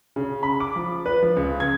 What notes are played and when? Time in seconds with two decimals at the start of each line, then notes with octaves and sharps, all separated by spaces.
0.16 C#3
0.43 B5
0.60 D6
0.76 F3
1.06 B4
1.23 F3
1.36 C#2
1.60 G#6